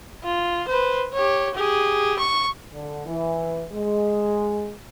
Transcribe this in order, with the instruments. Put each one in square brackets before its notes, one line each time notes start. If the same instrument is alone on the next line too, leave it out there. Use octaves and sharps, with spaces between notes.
[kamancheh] F4
B4 C5
G4 C#5
G4 G#4
C#6
[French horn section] D3
E3
G#3